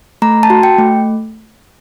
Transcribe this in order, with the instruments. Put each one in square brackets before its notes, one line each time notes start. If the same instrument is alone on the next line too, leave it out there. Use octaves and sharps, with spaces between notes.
[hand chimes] A3 A#5
A5
F#4
G5
A3